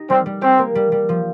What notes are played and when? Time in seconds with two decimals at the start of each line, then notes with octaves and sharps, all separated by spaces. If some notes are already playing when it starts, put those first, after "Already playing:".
Already playing: D#4 G4
0.10 G3 C4
0.26 G3
0.42 C4 G4
0.58 A#3
0.75 G3
0.92 G3
1.09 F3